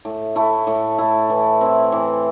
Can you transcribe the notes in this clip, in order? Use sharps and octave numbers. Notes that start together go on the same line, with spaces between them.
A2
A3 E4
A2
A3 E4
E3
C4 E4
E3